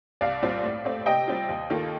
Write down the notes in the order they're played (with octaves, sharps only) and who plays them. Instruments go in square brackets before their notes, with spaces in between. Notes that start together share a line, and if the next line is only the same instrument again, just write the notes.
[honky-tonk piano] C2 [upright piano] D5 F5
[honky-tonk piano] A#2 G3 C4 F4
A2
A3 C4
[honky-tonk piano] C3 [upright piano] D#5 G5
[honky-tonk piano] G3 C4 F4
D#2
D#3 A#3 F4 A4